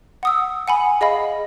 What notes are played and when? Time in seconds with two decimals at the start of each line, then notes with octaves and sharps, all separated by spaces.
0.23 F#5 D#6 E6
0.68 F#5 G#5 B5
1.01 G#4 D#5 F5 B5